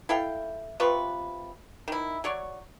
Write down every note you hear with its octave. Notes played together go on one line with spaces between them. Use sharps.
E4 A4 F5 G5
C3 F4 B4 C#6
D#3 E4
F#3 C#5 D5 C#6